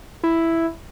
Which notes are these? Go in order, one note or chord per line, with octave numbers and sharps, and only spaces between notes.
E4